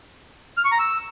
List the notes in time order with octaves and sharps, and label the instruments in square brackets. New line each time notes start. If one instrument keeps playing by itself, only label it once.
[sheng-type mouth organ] F6
C#6
A#5
E6